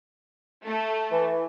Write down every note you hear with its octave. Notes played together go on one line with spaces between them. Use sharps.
A3
E3